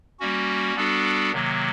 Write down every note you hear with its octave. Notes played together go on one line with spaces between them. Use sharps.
G3 A#3 C#4 F#4
G3 B3 D4 F#4 A4
C3 D#3 F#3 A#3